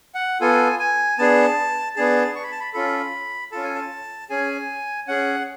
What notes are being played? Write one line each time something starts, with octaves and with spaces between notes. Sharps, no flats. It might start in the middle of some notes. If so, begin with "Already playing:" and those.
F#5
B3 F4 A4 G#5
G#5
B3 D4 G#4 A5
B3 D4 G#4 A5
C#6
B5
A5
B5
C#4 F4 A4 B5
C#4 F4 A4 A5
G#5
A5
C#4 G#4 G#5
C#4 G#4 F#5